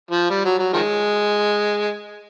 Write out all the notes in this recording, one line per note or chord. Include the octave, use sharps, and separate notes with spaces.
F3
G3
F#3
F#3
D#3 F3 G#3